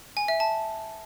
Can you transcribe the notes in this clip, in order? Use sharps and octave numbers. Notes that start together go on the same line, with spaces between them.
G#5
E5
A5